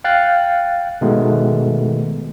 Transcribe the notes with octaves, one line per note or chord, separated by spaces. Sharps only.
F5 G5 F#6 A6
B2 D#3 G#3 A3 B3